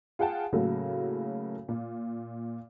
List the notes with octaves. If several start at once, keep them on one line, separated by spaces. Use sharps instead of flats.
F4 G#4 F#5 G5 A5
A2 C#3 F#3 A#3 F#4 A4
A#2